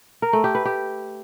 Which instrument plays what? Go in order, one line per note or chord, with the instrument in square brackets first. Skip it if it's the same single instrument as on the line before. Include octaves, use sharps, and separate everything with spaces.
[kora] A#4
A3
G4
B4
G4